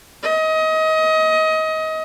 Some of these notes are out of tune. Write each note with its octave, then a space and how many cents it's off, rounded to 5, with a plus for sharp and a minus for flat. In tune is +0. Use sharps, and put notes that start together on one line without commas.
D#5 +25